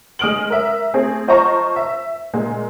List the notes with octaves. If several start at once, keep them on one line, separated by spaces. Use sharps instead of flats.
G#3 D#6 F6 D7 F#7
A#4 E5
A3 C4 G#4
F4 C5 D#5 A5 A#5 C#6
E5
A#2 G#3